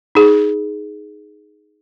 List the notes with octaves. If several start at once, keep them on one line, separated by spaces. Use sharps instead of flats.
D#4 G#4